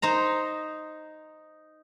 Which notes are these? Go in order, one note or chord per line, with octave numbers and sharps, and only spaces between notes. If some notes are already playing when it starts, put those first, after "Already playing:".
D#4 C5 A#5